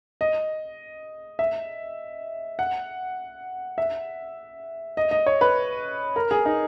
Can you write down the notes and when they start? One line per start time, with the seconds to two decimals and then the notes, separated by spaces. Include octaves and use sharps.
0.21 D#5
1.39 E5
2.59 F#5
3.78 E5
4.97 D#5
5.11 D#5
5.26 C#5
5.41 B4
6.16 A#4
6.31 G#4
6.45 D#4